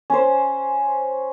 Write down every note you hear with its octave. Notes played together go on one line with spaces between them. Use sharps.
C#4 C5